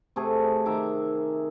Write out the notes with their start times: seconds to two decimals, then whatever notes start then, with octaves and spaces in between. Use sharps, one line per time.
0.16 C3 A3 G#4
0.66 D#3 E5 A#5 D6